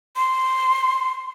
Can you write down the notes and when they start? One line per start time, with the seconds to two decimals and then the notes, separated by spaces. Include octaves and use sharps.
0.16 C6